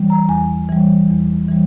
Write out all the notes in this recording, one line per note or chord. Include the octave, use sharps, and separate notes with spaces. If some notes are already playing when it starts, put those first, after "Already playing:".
Already playing: E3 G3
A#5
E2 G#5
E3 G3
E2
E3 G3